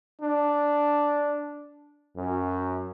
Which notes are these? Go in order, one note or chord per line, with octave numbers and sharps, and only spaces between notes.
D4
F#2